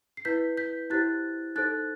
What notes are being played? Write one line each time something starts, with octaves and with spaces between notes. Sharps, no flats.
C7
E4 B4 G6 B6
G6 B6
E4 G4 C5 F#6 A6
D#4 A4 C5 F#6 A6